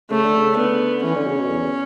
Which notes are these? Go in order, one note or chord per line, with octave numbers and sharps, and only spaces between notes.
C#3 A3
D3
C#3
D3 B3
E3 C#4
D3
C#3
B2
E2